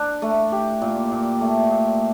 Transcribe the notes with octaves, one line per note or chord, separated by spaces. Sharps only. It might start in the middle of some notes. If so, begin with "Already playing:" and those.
Already playing: D4
A3
G4
A#2
A#2
A3
A#2